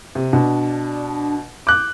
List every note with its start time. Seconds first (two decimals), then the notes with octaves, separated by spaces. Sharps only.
0.15 C3
0.33 B2 D4
1.67 D6 F#6 G6